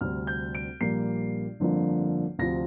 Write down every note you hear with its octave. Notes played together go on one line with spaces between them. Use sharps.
D2 C3 G3 C4 F6
G6
D7
A#1 A#2 G3 A#3 C7
G1 F2 D3 F3 A#3
D2 C3 F3 C4 A#6